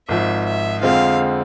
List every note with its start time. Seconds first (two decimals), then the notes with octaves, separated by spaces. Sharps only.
0.09 G#1 G#2 F3 E5
0.45 E5
0.81 F2 D3 G#3 C4 F4 F5